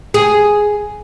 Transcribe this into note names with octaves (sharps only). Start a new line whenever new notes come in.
G#4